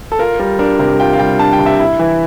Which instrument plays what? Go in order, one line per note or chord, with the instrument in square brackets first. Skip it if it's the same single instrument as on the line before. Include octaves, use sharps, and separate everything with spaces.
[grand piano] A4
F4 A#4
G3 A#4
D4 A#4
C3 A#4
F4 G5
F5
G3 G5
D4 A5
G5
C3
E5
E4
E3